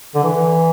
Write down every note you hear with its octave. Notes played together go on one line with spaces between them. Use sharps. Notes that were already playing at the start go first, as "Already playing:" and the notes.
D3
E3